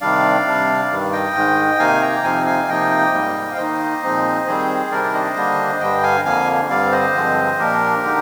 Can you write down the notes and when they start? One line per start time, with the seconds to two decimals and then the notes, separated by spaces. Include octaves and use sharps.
0.01 C3 D#3 G3 D4 D5 F5
0.46 C3 G3 D4
0.90 G2 D#3 G3
1.12 D#5 G5
1.35 G#2 D#3 G#3
1.79 C3 D#3 A#3 D#4 F5 G#5
2.02 G5 A#5
2.24 F2 C3 F3 C4 D#4 F5 G#5
2.46 F5 G#5
2.69 C3 F3 A#3 D#4 D#5 G5
3.13 G#2 G3 A#3
3.51 F5
3.57 D#3 A#3 D#4 C5 D#5
4.02 A#2 F3 G#3 C4 D#4
4.46 D#3 G3 C4 G#4 C5
4.91 C3 D#3 G3 D4 A#4 D5
5.04 D5
5.13 C5 D#5
5.36 D3 G3 A#3 D4
5.80 G2 D3 G3 D#5 G5
6.03 F5 G#5
6.25 F2 D3 F3 A#3 F5 G#5
6.70 G2 D3 G3 C4 D5 F5
6.92 C5 D#5
7.14 G2 D3 F3 G#3 C4
7.58 A#2 F3 A#3 D4 G4 A#4
8.03 D3 G#3 D#4